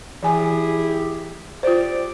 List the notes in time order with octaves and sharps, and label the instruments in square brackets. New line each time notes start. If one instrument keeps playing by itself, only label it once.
[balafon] E3 G#5 [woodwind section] E4 G4 G#4
[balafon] F4 C5 [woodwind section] G4 D5